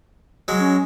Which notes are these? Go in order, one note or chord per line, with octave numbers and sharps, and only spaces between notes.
F#3 G#3
C#4